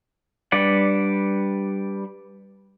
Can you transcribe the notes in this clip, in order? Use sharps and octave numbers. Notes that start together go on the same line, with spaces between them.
G3 D4 B4 D5 F#5